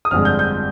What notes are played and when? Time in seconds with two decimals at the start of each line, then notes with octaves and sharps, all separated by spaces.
0.05 D#6
0.11 G1 F2 D3 G#3 F6
0.25 G6
0.39 G6